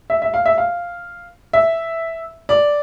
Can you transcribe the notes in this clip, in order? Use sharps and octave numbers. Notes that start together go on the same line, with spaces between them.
E5
E5
F5
E5
F5
E5
D5